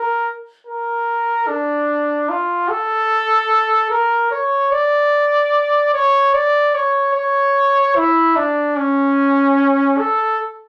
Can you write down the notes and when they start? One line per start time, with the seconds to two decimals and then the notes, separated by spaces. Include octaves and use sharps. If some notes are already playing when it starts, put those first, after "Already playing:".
Already playing: A#4
0.67 A#4
1.47 D4
2.29 F4
2.69 A4
3.90 A#4
4.31 C#5
4.71 D5
5.94 C#5
6.34 D5
6.75 C#5
7.15 C#5
7.96 E4
8.36 D4
8.77 C#4
9.98 A4